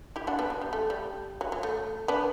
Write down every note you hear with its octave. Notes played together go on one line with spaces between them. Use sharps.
E4 G4
D4 F#4
B3 D4
F#3
G3
A3
G3
F#3
F#3
A3
B3 D4